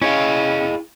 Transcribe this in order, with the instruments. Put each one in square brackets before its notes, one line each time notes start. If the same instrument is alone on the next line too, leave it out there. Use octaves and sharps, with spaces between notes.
[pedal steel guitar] C#4 [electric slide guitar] E4 G#4 F5 [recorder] D#5